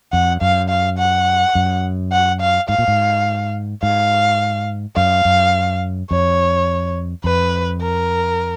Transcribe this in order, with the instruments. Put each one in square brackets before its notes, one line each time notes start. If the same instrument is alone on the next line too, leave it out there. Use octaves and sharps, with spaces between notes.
[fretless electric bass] F2 [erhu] F#5
[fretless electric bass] F#2 [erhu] F5
[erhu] F5
F#5
[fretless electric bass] F#2
[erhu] F#5
F5
[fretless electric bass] G#2 [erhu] F5
[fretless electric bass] A#2
G#2
[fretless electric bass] G#2 [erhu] F5
[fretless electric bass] F#2 [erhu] F5
[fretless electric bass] F#2
[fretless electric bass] F2 [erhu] C#5
[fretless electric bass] F2 [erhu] B4
[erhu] A#4